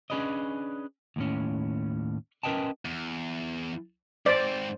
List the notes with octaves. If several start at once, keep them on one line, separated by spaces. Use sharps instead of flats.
C#4 D4 G#4 B4 D5 D#5
D#2 A2 C#4
C#4 A#4 B4 D#5 G5 A5
E2
G#2 C4 C5 D5